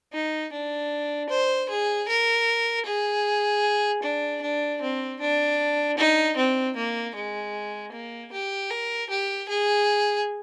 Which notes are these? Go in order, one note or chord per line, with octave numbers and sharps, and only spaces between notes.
D#4
D4
C5
G#4
A#4
G#4
D4
D4
C4
D4
D#4
C4
A#3
G#3
A#3
G4
A#4
G4
G#4